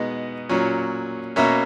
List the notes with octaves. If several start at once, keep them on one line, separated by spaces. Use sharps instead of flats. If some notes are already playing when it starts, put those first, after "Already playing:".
Already playing: B2 G#3 B3 D#4 D#5
A#2 F#3 C#4
B2 A#3 C#4 E5